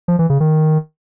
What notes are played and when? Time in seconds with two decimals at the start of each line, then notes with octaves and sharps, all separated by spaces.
0.08 F3
0.19 E3
0.30 C#3
0.40 D#3